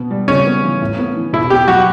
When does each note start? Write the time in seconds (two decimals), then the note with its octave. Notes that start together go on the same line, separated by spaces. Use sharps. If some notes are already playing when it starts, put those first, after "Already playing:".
Already playing: B2 B3
0.10 G3
0.28 C#3 C#4
0.46 B3
0.64 E3
0.81 A2
0.98 B3
1.16 E3
1.33 B2 E4
1.50 B3 G4
1.68 F#3 F#4